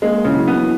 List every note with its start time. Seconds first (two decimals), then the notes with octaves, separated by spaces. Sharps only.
0.02 G#3 A#3
0.24 C#3 E3
0.36 F#3
0.47 B3
0.53 E3